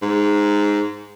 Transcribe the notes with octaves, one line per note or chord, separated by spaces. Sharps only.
G#2